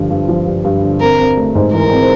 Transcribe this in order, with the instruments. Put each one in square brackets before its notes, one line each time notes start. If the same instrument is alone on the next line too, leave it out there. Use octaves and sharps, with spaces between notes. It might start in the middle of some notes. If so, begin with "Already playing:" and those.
Already playing: [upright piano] G2 D3 F3
G2
F3
G2
G2
D3
[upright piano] C4 [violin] A#4
[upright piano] C4
A3
G#2
[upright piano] E3 [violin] A#4
[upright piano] C4